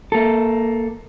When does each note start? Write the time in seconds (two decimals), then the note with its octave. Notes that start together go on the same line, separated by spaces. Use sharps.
0.12 A#3 A4